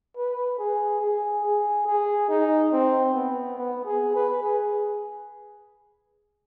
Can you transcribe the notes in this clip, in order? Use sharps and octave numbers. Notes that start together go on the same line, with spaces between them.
B4
G#4
G#4
G#4
G#4
D#4
C4
B3
B3
G#4
B4
G#4